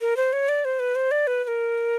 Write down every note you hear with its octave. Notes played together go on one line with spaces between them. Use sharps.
A#4
C5
C#5
D5
C5
B4
C5
D5
B4
B4
A#4